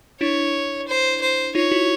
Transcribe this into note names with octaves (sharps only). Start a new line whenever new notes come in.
D4 E4 C#5
C5
C5
D#4 F4 C#5
E4 F#4